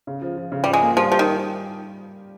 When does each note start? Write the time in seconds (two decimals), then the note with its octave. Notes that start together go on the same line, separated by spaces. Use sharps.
0.07 C#3
0.22 F3
0.37 F3
0.52 C#3
0.64 F3 G3
0.73 G#3
0.81 A#3
0.97 F3 G3
1.11 F3 G4
1.19 D#3